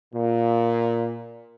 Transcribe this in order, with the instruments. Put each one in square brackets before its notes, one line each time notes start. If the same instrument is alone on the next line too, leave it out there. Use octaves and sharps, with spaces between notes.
[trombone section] A#2